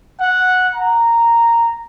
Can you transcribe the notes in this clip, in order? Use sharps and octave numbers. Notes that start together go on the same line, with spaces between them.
F#5
A#5